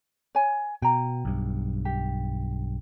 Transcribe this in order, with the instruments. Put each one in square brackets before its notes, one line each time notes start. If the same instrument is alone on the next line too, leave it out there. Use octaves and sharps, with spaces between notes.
[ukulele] C#5 G#5
[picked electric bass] B2 [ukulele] G5 A#5
[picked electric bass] B1 G2
[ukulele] G4